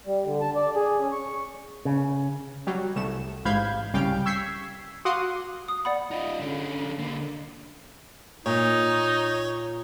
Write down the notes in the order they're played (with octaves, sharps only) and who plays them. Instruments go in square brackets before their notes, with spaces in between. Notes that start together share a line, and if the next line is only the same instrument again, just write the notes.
[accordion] G3
D3
A5
D5
G#4
C#4
C#6
[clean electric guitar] C#3
[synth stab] F#3 G3
C2 A3 E7
A1 G#2 F5 B5 G6 G#6
C2 C#3 G3 F5 G5 D7
C#6 E6 G6 G#6 B6 C7
F#4 F5 F#5 C6 D6 D#6
[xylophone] D#6
D5 F#5 B5
[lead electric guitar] D#4 F4
D3 C#4
D3 A#3
[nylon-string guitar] A#2 [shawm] D#4 [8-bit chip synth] C#5